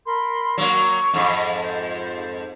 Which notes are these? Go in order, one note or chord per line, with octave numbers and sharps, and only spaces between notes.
A#4 B5 C6
F#3 A#3 C#6
F2 G#2
C5